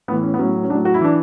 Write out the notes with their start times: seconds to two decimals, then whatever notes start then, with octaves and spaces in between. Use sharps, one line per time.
0.08 A2 B3
0.12 E3
0.23 C#4
0.34 B3
0.39 A2 F#3 C#4
0.64 C#4
0.70 F#3 D4
0.73 A2
0.85 F#4
0.94 E4
1.01 E3 D4